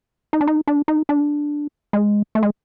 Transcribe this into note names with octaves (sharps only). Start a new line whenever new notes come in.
D#4
D4
D#4
D4
D#4
D4
G#3
A3
G#3